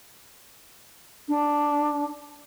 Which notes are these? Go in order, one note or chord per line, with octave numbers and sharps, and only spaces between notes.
D4